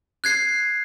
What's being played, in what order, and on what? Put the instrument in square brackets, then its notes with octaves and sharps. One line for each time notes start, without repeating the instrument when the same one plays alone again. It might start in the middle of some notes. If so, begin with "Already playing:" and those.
[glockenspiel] F#6 G#6 C7